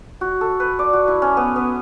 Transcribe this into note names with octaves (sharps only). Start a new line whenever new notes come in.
F#4
A4
B4
D5
F#4
E4
C#4
B3
B3